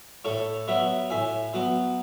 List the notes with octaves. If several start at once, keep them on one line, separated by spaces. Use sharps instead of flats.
A2 A4 C#5
F#3 B3 C#5 E5
A2 E5 G#5
F#3 B3